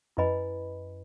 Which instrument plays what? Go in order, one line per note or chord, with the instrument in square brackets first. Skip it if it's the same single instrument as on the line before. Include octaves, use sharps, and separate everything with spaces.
[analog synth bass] F#2 [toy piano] E4 B4 D#5 G#5 B5